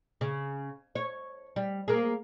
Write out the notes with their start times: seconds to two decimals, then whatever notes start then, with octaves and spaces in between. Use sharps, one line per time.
0.21 C#3
0.95 C#5
1.56 G3
1.88 A#3 G#4